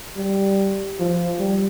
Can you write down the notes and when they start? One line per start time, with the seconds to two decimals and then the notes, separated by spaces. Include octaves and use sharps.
0.17 G3
0.99 F3
1.39 G3